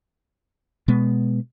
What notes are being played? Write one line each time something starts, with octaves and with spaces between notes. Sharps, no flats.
B2 G#3 B3